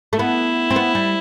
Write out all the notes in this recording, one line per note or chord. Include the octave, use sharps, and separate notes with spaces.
A3
B3 E4
C4
B3
G3